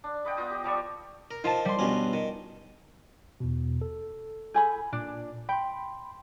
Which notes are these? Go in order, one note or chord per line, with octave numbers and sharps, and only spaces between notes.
D4
B4 D#5 F#5 G5
B3 F4 D#5
G4 D#5
F3 G3 D5 C#6
A#4
D#3 F3 F4 A5
G3 C6
G2 B2 C#4
D#3
E2 B2
A4
G#4 A4 G#5 B5 G6
A#2 D4
G5 B5 C6